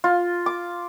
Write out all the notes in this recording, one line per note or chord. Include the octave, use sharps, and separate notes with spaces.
F4
D6